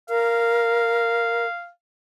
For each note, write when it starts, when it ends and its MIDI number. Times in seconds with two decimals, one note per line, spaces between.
0.10 1.46 70
0.10 1.69 77